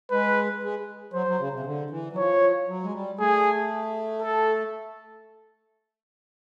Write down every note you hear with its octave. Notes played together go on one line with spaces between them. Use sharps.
G#3 B4
G#3
F#3 C5
F#3
C#3
C3
C#3
D3
E3
F#3
F3 C#5
F#3
G#3
G3
A3 G#4
A4